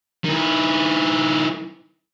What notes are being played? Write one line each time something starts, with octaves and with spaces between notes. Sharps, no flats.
D#3 E4